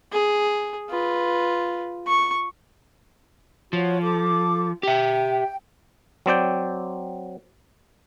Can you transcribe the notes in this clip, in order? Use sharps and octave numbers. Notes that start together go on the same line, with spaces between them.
G#4
F4 B4
C#6
F3 F#4 C#5
A4 D6
G4 E5 G5
F#3 C4 D5 G5